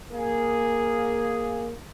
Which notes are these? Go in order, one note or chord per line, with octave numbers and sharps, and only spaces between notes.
A#3 G#4